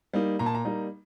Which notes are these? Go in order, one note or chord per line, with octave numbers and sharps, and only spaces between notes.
G3 A#3 D#4
A#2 A#5
A5
A#5
G3 A#3 D#4